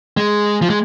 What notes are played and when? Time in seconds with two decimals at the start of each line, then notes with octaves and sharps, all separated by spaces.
0.17 G#3
0.62 F3
0.70 G#3